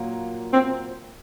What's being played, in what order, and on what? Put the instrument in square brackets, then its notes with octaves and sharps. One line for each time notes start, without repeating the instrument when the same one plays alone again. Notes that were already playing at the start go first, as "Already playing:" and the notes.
Already playing: [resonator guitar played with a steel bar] A#2 F#3 A#3
[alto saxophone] C4